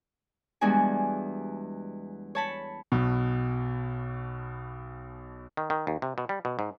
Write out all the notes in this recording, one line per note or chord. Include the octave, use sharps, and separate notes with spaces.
E2 G3 G#3 D4 F#4 G#5
C#5 A5 B5
B1 B2
D#3
D#3
D#2
C3
B2
G3
B2
G#2